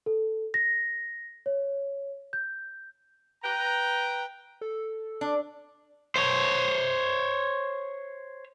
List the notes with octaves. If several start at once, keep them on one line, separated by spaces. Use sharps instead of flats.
A4
A#6
C#5
G6
B4 G5 A#5
A4
D4
C5 C#5